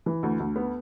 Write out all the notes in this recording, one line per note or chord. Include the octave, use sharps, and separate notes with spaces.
E3
D2
D2
B3